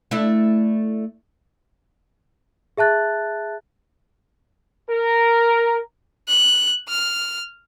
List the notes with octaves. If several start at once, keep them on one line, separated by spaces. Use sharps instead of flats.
A3 D4 E4
G#4 E5 A5 F#6 A6
A#4
F#6
F6